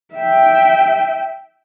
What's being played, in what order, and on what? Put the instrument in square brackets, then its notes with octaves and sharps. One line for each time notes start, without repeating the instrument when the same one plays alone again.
[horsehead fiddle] E5 G5